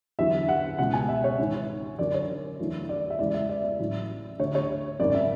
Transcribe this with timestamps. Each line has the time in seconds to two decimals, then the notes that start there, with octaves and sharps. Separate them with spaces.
0.19 E2 D3 F#3 E5
0.48 F#5
0.78 C#2 B2 G#3 F#5
0.94 G#5
1.09 E5
1.24 C#5
1.39 G#1 G#2 E3
1.99 F#2 D3 F#3 D5
2.14 C#5
2.59 E2 D3 F#3 A3
2.89 D5
3.10 E5
3.19 E2 C#3 G#3 D5
3.34 E5
3.49 D5
3.64 D5
3.79 A1 A2 F#3 A3
4.39 D2 D3 A3 C#5
4.55 C#5
5.00 G#1 F#2 C#3 D5
5.15 E5